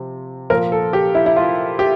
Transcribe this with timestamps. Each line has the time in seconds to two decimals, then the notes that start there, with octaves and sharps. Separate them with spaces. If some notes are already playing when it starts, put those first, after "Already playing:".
Already playing: C3 F3
0.50 A#2 F3 A#4
0.72 A4
0.93 G4
1.15 E4
1.26 E4
1.36 F4
1.79 G4